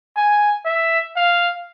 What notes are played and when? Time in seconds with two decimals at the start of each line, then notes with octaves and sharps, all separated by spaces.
0.16 G#5
0.65 E5
1.16 F5